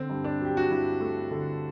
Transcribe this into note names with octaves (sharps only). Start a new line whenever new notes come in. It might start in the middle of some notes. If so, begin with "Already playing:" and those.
Already playing: D3 C4
G2
D4
F#3 G4
F#4
G2 E4
A3
D3